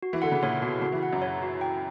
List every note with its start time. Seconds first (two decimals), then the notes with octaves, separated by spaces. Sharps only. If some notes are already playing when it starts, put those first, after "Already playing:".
0.03 F#4
0.13 E3
0.22 D3 F#5
0.32 C#3
0.42 A#2 C#5
0.62 B2 F#4
0.82 C#3 F#4
0.92 E3
1.03 F#5
1.13 F#2
1.22 C#5
1.42 F#4
1.61 G5